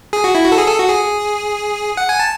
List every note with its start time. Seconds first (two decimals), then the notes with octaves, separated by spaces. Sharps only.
0.13 G#4
0.24 F#4
0.35 E4
0.45 F#4
0.52 A4
0.57 G#4
0.67 A4
0.79 F#4
0.88 G#4
1.97 F#5
2.09 G#5
2.20 A5